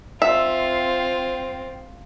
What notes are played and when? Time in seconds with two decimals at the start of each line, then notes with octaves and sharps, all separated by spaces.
0.22 C4 F4 E5